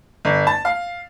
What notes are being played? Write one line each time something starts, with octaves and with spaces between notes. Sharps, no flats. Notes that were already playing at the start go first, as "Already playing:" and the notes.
G1
A5
F5